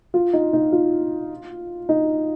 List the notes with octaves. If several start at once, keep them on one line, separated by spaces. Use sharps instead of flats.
F4
D#4
D#4
F4
D#4